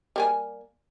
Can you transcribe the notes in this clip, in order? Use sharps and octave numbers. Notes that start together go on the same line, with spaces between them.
G3 A#3 G#5